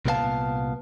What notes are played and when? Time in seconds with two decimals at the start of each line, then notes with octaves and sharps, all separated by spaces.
0.06 C2 A#2 B3 D4 F5 A5